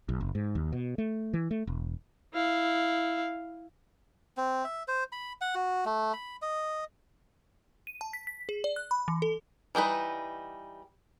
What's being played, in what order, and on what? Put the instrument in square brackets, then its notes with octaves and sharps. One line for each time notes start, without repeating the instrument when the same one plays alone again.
[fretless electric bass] B1
F#1
G#2
D#2
B2
A3
E3
A3
E1
[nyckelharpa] E4 F5
[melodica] C4
E5
C5
B5
F#5
F#4
A3
B5
D#5
[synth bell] D#7
A5
B6
B6
G#4
D5
F#6
B5
E3
A4
[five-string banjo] E3 G3 D#4 B4